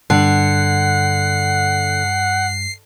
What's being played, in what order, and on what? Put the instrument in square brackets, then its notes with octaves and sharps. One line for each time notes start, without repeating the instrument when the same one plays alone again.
[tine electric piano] G2 [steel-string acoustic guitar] D3 [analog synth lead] F#5 [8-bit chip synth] C7